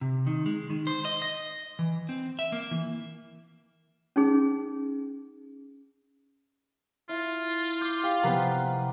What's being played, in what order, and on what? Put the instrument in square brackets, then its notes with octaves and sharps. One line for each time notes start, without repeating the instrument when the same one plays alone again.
[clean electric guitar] C3
D#3
G#3
D#3
C5
D#5
D#5
E3
C4
E5
A#3
E3
[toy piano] C#4 D#4 G#4
[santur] E4 [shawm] F4
[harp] D6 G6 C7
[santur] G4 [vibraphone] F5
[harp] C3 F3 B3 [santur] A#3 G4 B4 [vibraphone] F#5 A#5